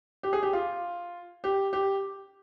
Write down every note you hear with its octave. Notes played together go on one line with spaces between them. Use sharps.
G4
G#4
G4
F4
G4
G4